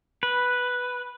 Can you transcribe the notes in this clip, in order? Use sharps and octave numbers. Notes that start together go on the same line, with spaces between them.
B4